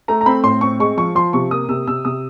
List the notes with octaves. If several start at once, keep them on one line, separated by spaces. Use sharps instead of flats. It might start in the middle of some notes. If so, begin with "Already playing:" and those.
A3 A#5
A#5
C4 B5
A2 C6
C4 C#6
G#3 C#6
F3 C#6
F3 C6
C3 C#6
A#3 D#6
C3 E6
C3 E6
C3 D#6